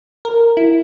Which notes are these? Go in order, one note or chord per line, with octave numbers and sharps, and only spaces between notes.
A#4
E4